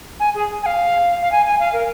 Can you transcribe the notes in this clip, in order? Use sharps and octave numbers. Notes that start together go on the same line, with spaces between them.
G#5
G#4
G#5
F5
F5
G#5
G#5
F5
A#4